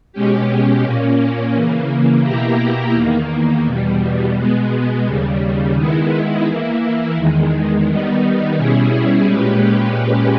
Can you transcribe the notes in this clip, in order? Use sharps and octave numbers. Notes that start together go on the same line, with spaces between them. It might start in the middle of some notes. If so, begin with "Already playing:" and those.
B2 G#3 C#4 G4
A#2 A#3 C#4
C#3 E3 A#3
B2 A#3 E4 G4 A#4
E2 D#3 A#3
E2 B2 G3
B2 G#3 B3
D#2 C#3 G3
D#3 G#3 B3 E4
E3 A#3 E4
E2 D#3 G#3
D#3 G3 B3 D#4
B2 G3 C#4 E4 G#4
A#2 G#3 C#4 G4 B4